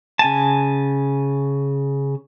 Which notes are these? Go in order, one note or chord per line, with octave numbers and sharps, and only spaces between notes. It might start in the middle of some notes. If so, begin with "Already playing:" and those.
C#3 G#5 A5